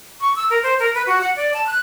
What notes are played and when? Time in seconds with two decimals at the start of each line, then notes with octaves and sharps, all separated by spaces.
0.21 C#6
0.36 E6
0.50 A#4
0.63 C5
0.80 A#4
0.95 B4
1.06 F#4
1.21 F#5
1.36 D5
1.54 A5
1.67 F#6